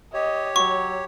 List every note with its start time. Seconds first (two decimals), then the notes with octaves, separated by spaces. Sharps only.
0.14 G4 C#5 D#5
0.56 F#3 C#6